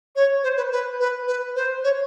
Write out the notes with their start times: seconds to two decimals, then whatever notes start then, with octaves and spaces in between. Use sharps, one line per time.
0.15 C#5
0.43 C5
0.57 B4
0.71 B4
1.00 B4
1.27 B4
1.55 C5
1.84 C#5